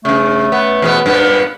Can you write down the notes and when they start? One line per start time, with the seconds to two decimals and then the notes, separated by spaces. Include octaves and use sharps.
0.05 G2 C#3 A3
0.52 B3
0.82 E2 B2 B3
1.06 G2 A#2 B3